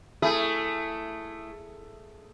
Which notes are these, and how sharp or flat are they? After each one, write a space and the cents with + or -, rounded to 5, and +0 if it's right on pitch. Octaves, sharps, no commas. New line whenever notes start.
A3 +10 E4 +10 G#4 +0